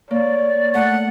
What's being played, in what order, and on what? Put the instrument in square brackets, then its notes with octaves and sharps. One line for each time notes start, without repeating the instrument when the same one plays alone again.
[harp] A#3 [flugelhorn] C#5 [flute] D5
[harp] A3 [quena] F#5